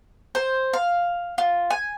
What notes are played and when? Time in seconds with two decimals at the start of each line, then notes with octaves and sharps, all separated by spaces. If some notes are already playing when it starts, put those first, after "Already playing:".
0.35 C5
0.73 F5
1.38 F4
1.70 G#5